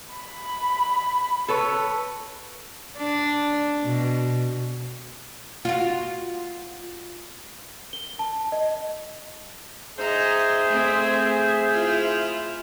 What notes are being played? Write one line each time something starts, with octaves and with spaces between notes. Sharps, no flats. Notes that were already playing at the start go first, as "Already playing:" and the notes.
B5
A4 B4 C#5
D4
B2
F4 F#4
G7
A5
D#5
D#4 G#4 C5 D#5 E5
A3 C4
E4 F4